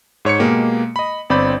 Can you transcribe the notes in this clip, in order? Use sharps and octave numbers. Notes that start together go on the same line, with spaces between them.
G#2 C#5 C#6 C#7
B2 G#3 A#3 G4
D#5 B5
G1 C4 D5 B5 G6